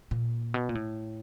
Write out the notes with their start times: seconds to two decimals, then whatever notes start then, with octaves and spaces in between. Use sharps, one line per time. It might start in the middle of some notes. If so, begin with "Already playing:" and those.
0.11 A#2
0.54 B2
0.69 A#2
0.75 A2